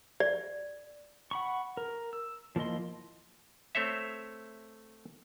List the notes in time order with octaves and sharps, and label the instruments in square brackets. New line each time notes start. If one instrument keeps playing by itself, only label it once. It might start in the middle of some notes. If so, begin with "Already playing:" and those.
[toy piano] D5
[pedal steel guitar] F#5 B5 C#6
A#4
E6
F3 A#3 E4 D#5 C6
[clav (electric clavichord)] A3 C4 C5 C#5 E5